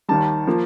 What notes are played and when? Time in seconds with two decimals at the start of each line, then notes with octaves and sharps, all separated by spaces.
0.08 D#2 D#3 G3 A5
0.47 F3 A#3